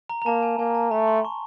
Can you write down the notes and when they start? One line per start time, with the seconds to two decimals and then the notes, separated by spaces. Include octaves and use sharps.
0.10 A#5
0.22 A#5
0.26 A#3 A5
0.43 G#5
0.59 A#3 G#5
0.75 A5
0.91 A3 A#5
1.07 C6
1.25 C#6